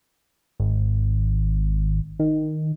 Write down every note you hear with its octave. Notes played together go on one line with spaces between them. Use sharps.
G#1
D#3